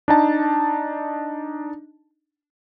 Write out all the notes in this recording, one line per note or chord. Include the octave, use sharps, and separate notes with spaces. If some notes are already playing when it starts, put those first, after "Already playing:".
D4 D#4 A5